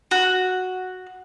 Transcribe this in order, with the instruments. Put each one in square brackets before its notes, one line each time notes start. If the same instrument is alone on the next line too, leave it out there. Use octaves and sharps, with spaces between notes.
[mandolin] F#4